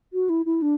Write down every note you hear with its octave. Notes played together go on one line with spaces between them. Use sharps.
F#4
E4
E4
D4